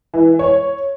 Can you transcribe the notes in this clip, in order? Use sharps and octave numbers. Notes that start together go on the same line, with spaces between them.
E3
C#5